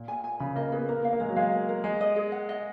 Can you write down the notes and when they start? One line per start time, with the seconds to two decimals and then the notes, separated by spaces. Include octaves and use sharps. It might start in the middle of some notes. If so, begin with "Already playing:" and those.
Already playing: A#2
0.08 G#5
0.24 G#5
0.40 C#3 B5
0.56 A#3 D#5
0.72 B3 G#4
0.89 A#3 A#4
1.05 F5
1.13 A#3
1.20 G#3 A#4
1.28 F#3
1.36 G#3 F5
1.52 A#4
1.69 A#4
1.84 G#3 D#5
2.01 D#5
2.16 G#4
2.32 F#5
2.49 D#5